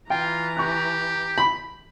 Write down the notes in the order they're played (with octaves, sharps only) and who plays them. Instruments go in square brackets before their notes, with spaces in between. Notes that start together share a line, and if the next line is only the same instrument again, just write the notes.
[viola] E3 A#5 [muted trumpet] F4 [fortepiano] G5
[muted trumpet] G4 [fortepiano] C#6 F#6
[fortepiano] B5